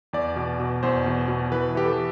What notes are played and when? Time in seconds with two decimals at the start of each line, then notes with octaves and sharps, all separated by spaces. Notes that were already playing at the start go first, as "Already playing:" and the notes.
0.13 E2 D5
0.36 B2
0.60 B2
0.83 E2 C5
1.06 B2
1.28 B2
1.52 E3 B4
1.75 E3 G4
1.85 A4